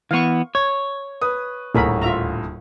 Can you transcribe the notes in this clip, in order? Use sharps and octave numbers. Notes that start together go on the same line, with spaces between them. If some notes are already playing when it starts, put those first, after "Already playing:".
E3 B3 F5 C#6
C#5 G#6
B4 D#6
D#1 D2 A2 G#4 A#4 B5
F4 E5 A#5